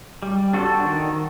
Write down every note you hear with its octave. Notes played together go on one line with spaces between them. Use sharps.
G3
D4 F#4 A4 C5
D#3